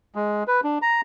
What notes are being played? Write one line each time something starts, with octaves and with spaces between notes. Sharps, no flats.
G#3
B4
D4
A#5